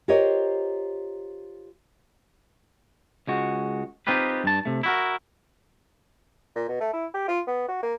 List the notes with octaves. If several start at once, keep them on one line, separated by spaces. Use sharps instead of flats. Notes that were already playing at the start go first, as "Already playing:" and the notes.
F4 G4 A#4 C5 C#5 D#5
C#2 G#3 F#4
C4 D#4 F4 G4 B4
G2 A5
C3 A3
E4 F#4 A#4
A#2
B2
A3
E4
G4
F4
B3
F#4
A#3